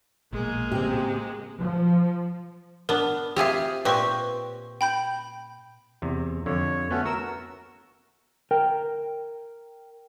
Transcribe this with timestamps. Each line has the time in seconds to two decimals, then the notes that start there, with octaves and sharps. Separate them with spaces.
0.33 A#1 B2 G#3 A#3
0.71 A2 C#3 C4 G4
1.59 F3
2.89 B3 D4 A#4
3.36 C4 F4 G4 G#4 E5
3.85 A#2 C4 G4 B4 C6 C#6
4.81 G5 B5 G6
6.02 E2 C3
6.46 F2 D3 C#5
6.91 A3 B3 C#4 F#4
7.05 F#4 A#4 E6
8.51 A#4 G5